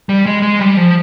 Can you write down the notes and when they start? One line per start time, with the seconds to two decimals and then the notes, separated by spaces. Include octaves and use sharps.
0.09 G3
0.26 G#3
0.42 G#3
0.60 G3
0.77 F3